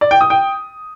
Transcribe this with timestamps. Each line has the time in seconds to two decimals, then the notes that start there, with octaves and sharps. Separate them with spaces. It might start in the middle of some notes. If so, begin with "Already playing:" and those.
0.01 D5
0.11 G5
0.21 D#6
0.30 G5